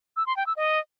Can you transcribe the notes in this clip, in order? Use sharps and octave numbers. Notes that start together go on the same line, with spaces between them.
E6
C6
G5
E6
D#5